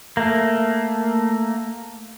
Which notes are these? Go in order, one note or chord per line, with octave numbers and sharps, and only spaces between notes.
A3 A#3